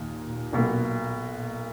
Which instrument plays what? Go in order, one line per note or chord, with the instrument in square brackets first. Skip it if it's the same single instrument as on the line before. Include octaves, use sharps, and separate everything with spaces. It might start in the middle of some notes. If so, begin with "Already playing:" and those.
Already playing: [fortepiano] D#2 [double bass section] A#2
[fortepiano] B1 B2 A#3
[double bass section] A#2